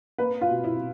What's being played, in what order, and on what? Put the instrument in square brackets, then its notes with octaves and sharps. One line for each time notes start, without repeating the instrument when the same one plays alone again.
[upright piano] A#3 B4
F4
B2
E4